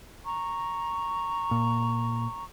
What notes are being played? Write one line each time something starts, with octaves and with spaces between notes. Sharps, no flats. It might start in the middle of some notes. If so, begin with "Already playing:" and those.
A#5 C#6
A#2